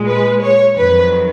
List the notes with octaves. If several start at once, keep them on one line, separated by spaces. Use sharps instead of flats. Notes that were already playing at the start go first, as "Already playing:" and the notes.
Already playing: A#2 G#3
B4
C#5
F2 D#3 F#3 B4